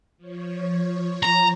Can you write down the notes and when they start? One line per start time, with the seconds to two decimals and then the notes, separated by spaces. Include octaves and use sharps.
0.17 F3 C#5
1.23 A#5